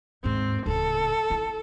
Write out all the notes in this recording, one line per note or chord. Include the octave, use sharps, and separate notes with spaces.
D#2 G#2 C4
D1 C#3 A4
E4 F4